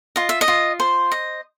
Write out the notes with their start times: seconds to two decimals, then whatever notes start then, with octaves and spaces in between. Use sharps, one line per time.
0.16 F4 D#5
0.29 E5
0.41 D#5
0.48 F4
0.80 C5
1.12 D#5